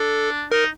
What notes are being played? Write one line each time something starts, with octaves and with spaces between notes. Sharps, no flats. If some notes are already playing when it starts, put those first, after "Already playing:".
Already playing: D4 A4
D#4 A#4